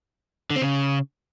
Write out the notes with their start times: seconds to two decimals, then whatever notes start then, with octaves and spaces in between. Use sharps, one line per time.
0.50 D3
0.56 C4
0.62 C#3